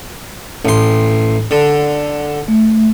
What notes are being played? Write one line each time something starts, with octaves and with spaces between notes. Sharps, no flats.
A1 C6
D3
A3